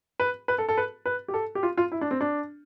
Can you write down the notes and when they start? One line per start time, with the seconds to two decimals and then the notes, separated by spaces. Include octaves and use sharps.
0.20 B4
0.48 B4
0.58 A4
0.69 A4
0.77 B4
1.06 B4
1.28 G4
1.34 A4
1.55 G4
1.63 F4
1.77 F4
1.92 E4
2.01 D4
2.11 C4
2.21 D4